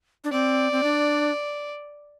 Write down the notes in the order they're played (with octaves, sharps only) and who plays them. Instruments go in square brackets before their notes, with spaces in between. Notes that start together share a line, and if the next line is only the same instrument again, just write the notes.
[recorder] D4
[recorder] C4 [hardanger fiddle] D5
[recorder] C4
D4